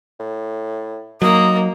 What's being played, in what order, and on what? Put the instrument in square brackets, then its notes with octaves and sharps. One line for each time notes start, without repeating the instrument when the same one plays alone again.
[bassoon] A2
[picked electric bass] F#3 [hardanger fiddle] A#3 [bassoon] D#4 [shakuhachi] D#6